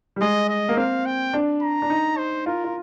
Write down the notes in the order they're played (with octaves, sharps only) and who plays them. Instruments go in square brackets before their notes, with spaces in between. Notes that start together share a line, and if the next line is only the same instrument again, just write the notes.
[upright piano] G3
[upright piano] G#3 [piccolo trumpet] D#5
[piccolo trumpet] D#5
[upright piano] A#3
[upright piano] C4 [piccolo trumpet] F5
[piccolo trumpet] G5
[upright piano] D4
[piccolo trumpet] A#5
[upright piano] D4
D#4
[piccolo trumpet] C5
[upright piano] F4 [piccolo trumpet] A#4
[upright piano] F4